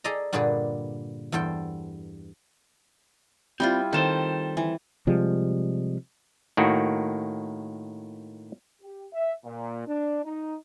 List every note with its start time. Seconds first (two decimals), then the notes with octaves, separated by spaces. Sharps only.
0.04 G#4 A4 D5 D#5 A#5
0.33 G2 A#2 D3 G#4 B4 D5
1.32 E2 G2 A4 C5 G5
3.60 G3 C4 E4 F4
3.93 D#3 G3 C4 A4 C5
4.57 E3
5.07 C3 F3 G3 G#3
6.57 A2 D#3 A#3 F#4
8.82 G4
9.13 E5
9.44 A#2
9.86 D4
10.24 D#4